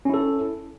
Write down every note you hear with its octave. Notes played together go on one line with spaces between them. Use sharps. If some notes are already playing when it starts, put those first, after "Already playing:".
C#4 E4 A4